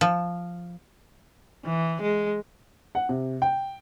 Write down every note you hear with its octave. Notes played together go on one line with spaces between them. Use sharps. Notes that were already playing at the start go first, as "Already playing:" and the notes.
F3
E3
G#3
F#5
C3
G5